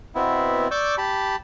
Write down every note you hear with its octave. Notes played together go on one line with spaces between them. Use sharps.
B2 B3 C4 E4
D5 C#6 D6 E6 G6
G4 A5 B5